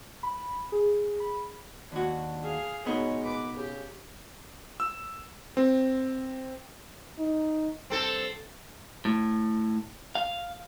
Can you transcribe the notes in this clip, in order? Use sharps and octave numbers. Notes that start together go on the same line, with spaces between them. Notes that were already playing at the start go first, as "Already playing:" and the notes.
B5
G#4
B5
D#2 D4 F#4
G#4 F5
B2 G#3 B3 D#4 C#5
B4 D6
C#3 G4
E6
C4
D#4
G2 C4 A4
A2
F5